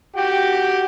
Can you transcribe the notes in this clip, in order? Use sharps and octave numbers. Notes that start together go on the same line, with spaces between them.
F#4 G4 G5